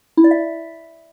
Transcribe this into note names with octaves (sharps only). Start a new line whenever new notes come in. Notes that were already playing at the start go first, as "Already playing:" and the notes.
E4
D5
E5